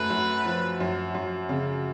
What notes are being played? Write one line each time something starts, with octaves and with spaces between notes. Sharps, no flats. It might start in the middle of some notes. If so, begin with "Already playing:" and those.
Already playing: F#2 A3 B4
F#2
F3
F#2
F#2
C#3